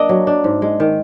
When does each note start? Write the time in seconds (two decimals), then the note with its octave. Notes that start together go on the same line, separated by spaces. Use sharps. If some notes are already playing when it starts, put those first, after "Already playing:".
Already playing: A#3 D4 D#5
0.09 F#3
0.27 D4
0.44 G#2
0.62 G#3
0.80 D#3